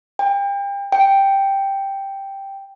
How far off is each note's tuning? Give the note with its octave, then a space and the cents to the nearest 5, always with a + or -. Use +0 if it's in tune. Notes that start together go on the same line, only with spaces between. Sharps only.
G5 +35
G5 +0